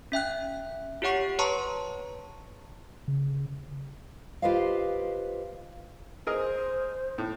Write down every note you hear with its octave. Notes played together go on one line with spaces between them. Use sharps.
C#4 E5 G5 F#6
F4 G4 C#5 F#5 C#6 C7
B4 C#5 A5 A#5 C6 C#6
C#3
F4 G4 B4 C5 D#5 F5
G#4 A#4 C5 D#5
A2